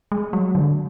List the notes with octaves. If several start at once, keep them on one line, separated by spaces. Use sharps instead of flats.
G#3
F#3
D3